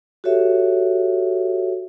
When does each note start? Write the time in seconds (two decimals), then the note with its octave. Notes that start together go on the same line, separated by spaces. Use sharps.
0.24 F#4 G4 A4 C#5 E5